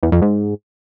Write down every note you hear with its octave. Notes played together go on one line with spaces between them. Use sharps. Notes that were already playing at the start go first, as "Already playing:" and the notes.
E2
F2
G#2